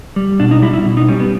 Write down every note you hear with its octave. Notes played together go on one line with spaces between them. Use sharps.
G3
B2 D4
D#4
G3 E4
E4
B2
D#4
G3 C#4
B3